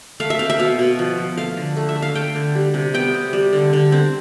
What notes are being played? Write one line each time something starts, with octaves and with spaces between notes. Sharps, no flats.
A3 F5
E5
C4 F5
E5
B2 F5
B2
F3
F3
A3 F5
D3
A3
E5
A3
F5
A3 G5
D3
G3
C3
B3 G5
C3
G3
D3
D3
C4